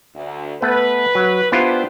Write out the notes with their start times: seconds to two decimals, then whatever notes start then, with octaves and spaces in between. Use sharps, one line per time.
0.15 D2
0.62 A3 B3 B4
1.15 F#3
1.52 B3 D4 E4 F4 G4 C5